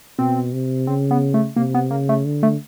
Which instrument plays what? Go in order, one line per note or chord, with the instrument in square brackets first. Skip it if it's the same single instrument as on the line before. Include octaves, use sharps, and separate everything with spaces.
[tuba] B2 [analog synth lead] C4
[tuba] C3
[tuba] C#3 [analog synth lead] C4
[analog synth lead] B3
A3
[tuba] C3 [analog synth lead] A#3
[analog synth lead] B3
[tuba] C#3 [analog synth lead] A#3
[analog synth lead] A3
[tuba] D3
[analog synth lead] A3